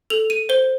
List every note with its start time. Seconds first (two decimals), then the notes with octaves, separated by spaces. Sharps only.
0.10 A4 F7
0.30 D#7
0.49 C5 G7